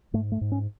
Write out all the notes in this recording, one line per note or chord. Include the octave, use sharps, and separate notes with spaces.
G#2 A3
A3
G#2
C#4